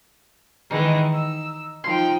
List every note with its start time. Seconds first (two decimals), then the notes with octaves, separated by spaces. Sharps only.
0.71 D#3 E3 G#3 D#4
1.12 E6
1.84 F3 D#4 G5 C6